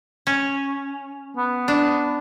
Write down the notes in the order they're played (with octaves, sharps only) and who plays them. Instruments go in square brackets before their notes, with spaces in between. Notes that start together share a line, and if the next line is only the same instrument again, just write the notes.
[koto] C#4
[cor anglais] B3
[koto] D4